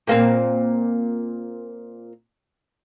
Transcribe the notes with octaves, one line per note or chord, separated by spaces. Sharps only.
A#2 A#3 C4